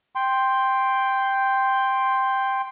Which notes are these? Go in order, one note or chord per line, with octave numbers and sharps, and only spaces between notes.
G5 C6